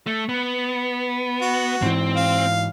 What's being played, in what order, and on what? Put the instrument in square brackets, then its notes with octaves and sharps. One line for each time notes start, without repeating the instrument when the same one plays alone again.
[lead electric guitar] A3
B3
[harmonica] F#4
[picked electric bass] G#2 E3 [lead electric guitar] C4
[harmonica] F5